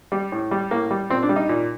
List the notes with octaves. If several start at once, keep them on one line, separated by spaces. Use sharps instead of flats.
G3
A2
G3
A2 A#3
G3
A#2 C4
D4
G3
D#4
A#2